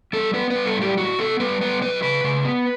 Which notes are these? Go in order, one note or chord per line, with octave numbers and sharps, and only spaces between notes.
G3 A4
B3 B4
B4
G3
A4
A2 G4
A2 F#4
B3 A4
G3 B4
B3 B4
F#3 B4
C#3 B4
C#3
B3